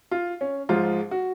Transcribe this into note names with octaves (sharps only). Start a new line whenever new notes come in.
F4
C#4
G#2 F3 G#3 F4
F#4